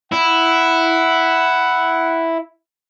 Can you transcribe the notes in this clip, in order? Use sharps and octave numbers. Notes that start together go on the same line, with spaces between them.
E4 F#5